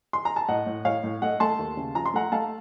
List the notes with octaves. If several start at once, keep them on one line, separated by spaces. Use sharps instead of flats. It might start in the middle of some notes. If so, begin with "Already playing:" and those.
C6
A#5
A5
A2 D#5 F#5
A2
A2 C#5 F5
A2
A3 D#5 F#5
A3 A5 C6
D#2
C#3
F3 A#5
C6
A3 F#5 A#5
A3 F5 A5